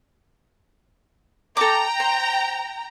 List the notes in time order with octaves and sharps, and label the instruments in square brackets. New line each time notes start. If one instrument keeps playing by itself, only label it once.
[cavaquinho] A4 D6 [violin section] G5 A#5
[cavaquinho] C5